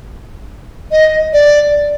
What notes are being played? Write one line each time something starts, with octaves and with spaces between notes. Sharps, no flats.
D#5
D5